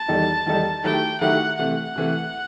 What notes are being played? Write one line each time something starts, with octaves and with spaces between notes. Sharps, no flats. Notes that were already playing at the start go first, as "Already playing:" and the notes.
Already playing: A5
E2 D#3 G3 D#4 A4
E2 D#3 G3 D#4 A4
D#3 F#3 A3 E4 G4 G5
D#3 F#3 A3 E4 G4 F#5
C3 E3 A3 F#5
C3 E3 A3